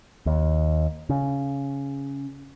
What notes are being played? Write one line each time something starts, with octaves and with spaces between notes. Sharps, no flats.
D#2
C#3